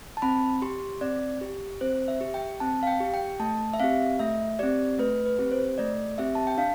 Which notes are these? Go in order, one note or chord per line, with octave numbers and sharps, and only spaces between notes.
A5
C4 B5
G4 C6
C4 D5
G4
C4 C5
E5
G4
G5
C4 A5
F5
G5
G4
G5
A3 A5
E5
C4 G4 F5
A3 E5
C4 G4 D5
A3 B4
B4
C4 G4
C5
A3 D5
C4 G4 E5
A5
G5
D4 F5